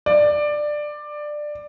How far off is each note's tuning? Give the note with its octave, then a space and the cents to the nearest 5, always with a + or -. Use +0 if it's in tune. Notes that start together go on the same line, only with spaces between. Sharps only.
D5 +15